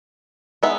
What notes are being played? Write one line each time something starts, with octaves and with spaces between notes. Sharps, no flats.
G#3 B3 D#4 E5